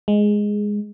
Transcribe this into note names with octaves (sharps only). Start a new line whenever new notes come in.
G#3